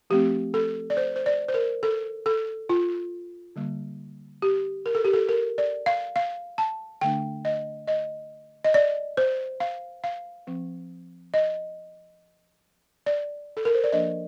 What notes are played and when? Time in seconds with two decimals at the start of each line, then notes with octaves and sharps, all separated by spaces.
0.10 F3 A3 C4 G4
0.54 A4
0.90 D5
0.97 C5
1.16 C5
1.26 D5
1.48 C5
1.54 A#4
1.83 A4
2.26 A4
2.69 F4
3.56 D3 G3 A#3
4.42 G4
4.86 A#4
4.95 A4
5.05 G4
5.13 A4
5.29 A#4
5.58 D5
5.86 F5
6.16 F5
6.58 A5
7.01 D3 A3 D4 G5
7.45 D#5
7.88 D#5
8.64 D#5
8.74 D5
9.17 C5
9.60 F5
10.04 F5
10.47 F3 C4
11.34 D#5
13.06 D5
13.57 A4
13.65 A#4
13.75 C5
13.84 D5
13.92 F3 A#3 D4 D#5